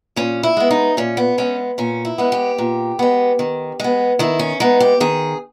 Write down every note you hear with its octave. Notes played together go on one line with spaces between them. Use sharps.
A#2 C#4
E4
G#3 B3
D#4
A#2 C#4
B3
G#3 B3 C#4
A#2 C#4
E4
G#3 B3
G4
A#2
G#3 B3
D#3
G#3 B3
D#3 E4
C#4
G#3 B3 D#4
G4
D#3 G#4